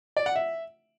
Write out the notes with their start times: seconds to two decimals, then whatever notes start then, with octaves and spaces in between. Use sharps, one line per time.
0.17 D5
0.26 F#5
0.36 E5